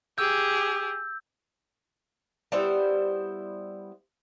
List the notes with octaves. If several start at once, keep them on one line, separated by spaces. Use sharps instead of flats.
G4 G#4 E6 G6
G3 B3 E4 C5